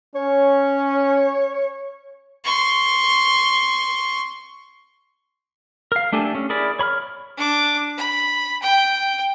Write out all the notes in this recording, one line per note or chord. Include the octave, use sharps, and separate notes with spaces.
C#4 C#5
C6 C#6
A#4 F5
A3 D4 G4 A4 G#5
C#4
E4 G#4 A#4 D5 B5
C#5 B5 C#6 F6
D4 D6
B5
G5